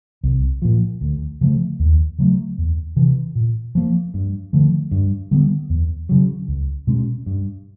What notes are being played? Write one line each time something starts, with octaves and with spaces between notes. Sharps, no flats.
C2
A#2 F3
D2
C#3 F3 A3
D#2
C#3 F#3 A3
E2
C3 E3
A#2
F3 A#3
G2
D3 F3 A3
G2
D3 G3 B3
E2
C#3 F#3
C#2
B2 G#3 C#4
G2